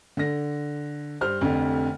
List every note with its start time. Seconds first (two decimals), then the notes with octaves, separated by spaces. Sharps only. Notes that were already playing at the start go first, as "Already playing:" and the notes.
0.17 D3 A#6
1.21 G2 C5 F6
1.41 F1 F2 D3